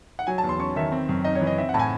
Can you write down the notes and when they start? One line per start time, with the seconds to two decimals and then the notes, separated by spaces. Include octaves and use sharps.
0.19 F#5
0.27 F#3 G#5
0.38 A5
0.44 E2
0.49 C6
0.59 C#4 C#6
0.76 D#3 E5
0.92 C4
1.09 F#2
1.24 D#4 D#5
1.35 C#5
1.41 E3
1.47 D#5
1.58 C4 E5
1.69 F#5
1.74 A2 A5
1.79 G#5